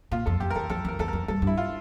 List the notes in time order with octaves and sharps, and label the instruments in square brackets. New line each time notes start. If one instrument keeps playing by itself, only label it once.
[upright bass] A#2 [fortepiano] F4
[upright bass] F2 [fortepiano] A4
[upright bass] F2 [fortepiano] G4
[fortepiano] A#4
[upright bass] E2 [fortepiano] A4
[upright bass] F2 [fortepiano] A4
[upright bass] F2 [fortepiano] A#4
[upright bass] E2 [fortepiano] A4
[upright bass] F2 [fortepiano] A#4
[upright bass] G2 [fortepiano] A4
[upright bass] G2
[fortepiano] E4
F4